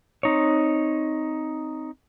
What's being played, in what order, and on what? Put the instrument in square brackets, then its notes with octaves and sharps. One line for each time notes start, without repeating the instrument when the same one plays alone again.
[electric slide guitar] C4 D#4 C#5